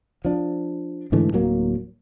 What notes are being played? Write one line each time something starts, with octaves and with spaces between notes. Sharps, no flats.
F3 D4
G#2 D3 E3 A3
D1 F#3 A#3